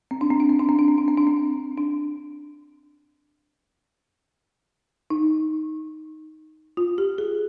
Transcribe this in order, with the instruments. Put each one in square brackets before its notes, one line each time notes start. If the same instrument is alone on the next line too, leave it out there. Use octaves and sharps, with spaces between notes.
[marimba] C4
D4
C4
D4
C4
D4
C4
D4
C4
D4
C4
D4
C4
D4
D#4
F4
G4
G#4